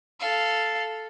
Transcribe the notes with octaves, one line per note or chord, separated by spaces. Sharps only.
A4 F5